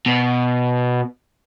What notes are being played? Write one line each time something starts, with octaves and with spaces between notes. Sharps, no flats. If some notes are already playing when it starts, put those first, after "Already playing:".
B2